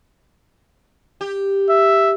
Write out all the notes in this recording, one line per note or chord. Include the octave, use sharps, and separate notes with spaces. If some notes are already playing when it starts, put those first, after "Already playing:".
G4
E5